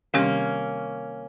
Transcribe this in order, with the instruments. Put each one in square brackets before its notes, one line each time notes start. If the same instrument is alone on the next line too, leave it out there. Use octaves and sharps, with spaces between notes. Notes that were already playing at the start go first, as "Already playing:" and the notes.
[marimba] C3 D#3 G3 C4 G4 [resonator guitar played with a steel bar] A#3 C#4